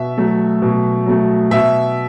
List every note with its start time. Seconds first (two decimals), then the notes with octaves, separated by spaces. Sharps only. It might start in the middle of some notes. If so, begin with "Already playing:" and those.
Already playing: B2 E5
0.18 F#3 A3
0.62 B2
1.06 F#3 A3
1.51 B2 E5